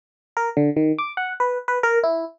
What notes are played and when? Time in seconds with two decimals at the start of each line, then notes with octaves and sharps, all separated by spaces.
0.37 A#4
0.57 D3
0.76 D#3
0.98 D6
1.17 F#5
1.40 B4
1.68 B4
1.83 A#4
2.04 E4